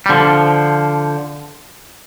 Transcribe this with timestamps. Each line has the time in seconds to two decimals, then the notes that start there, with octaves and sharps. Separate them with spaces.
0.06 G3
0.09 D3 F3